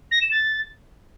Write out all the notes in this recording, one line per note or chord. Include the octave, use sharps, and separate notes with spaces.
A#6
E7
A6